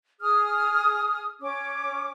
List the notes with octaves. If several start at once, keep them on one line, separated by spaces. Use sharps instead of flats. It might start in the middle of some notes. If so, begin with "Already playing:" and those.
G#4 D#6 F6
C#4 D6